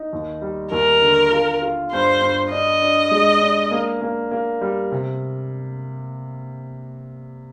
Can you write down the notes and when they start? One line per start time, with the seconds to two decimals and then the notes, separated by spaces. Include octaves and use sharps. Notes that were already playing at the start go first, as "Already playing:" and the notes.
Already playing: D#4
0.13 D#2
0.42 G3
0.72 D#2 A#4
1.02 D3
1.32 F4
1.62 F4
1.92 G2 C5
2.21 G2
2.51 D4 D#5
2.82 D4
3.11 G#3
3.41 D4
3.71 A#3
4.01 A#3
4.31 A#3
4.61 G3
4.92 C3